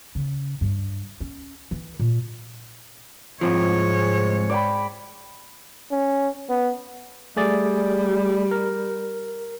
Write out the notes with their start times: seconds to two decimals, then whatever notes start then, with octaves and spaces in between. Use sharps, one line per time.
0.15 C#3
0.61 G2
1.20 C#4
1.71 E3
2.00 A#2
3.41 C2 G#2 C3 F3 G#3 C#5
4.50 D5 G5 B5
5.91 C#4
6.49 B3
7.37 G3 A3 G#4 D5
8.51 A#4